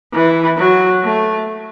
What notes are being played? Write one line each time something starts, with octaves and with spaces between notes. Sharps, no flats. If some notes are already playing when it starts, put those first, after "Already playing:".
E3
F#3
A3